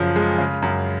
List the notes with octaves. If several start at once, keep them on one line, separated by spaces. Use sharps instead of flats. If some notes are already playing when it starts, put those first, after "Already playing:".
Already playing: F#2 C#3 F3
G#3
C#3
F#2